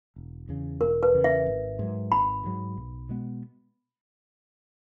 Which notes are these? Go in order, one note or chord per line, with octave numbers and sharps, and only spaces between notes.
E1
E2 C#3
E1 A#4
B4
E2 C#3
E5
G#1
G#2 F#3
G#1 B5
G#2 F#3
B1
B2 G#3 B3